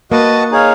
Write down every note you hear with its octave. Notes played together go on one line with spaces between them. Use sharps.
A#3 F#4 B4 D#5 F#5 A5
D#4 G#4 C#5 F5